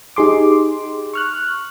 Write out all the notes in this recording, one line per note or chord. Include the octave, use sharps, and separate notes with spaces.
D#4 G4 G#4 C6 D6
C#6 F6 F#6